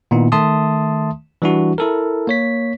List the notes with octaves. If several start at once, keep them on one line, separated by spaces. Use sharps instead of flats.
A#2 D#3 B3 D#4 E4
D#3 A3 E5 A5 C6 D#6
E3 G3 D4 E4 F#4
E4 A4 A#4
A#3 C#5 B6